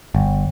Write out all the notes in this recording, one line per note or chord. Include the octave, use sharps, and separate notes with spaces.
G1